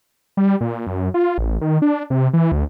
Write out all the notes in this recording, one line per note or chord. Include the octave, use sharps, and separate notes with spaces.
G3
A#2
F#2
F4
A1
D#3
D4
C3
E3
D2